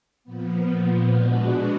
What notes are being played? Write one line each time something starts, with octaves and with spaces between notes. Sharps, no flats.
A#2 F3 B3
B2 G#3 B3 D4 F#4